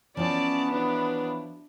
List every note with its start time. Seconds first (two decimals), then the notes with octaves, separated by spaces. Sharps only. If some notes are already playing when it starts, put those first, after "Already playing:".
0.17 F3 B3 C#4 E4 D5 A5
0.71 E3 F#3 D4 B4